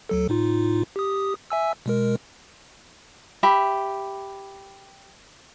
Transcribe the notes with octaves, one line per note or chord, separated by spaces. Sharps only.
D2 F#3 A4
A2 D#4 F4
G4 D#6
E5 G#5 E6
B2 G#3 A#4
G4 E5 B5